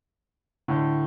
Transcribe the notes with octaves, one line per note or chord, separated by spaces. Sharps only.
A2 D3